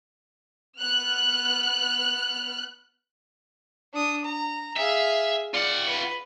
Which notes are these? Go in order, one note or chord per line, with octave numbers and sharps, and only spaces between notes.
B3 F6 F#6
D4 D#6
A#5
G#4 E5 F5
F4 D5 F#5
B4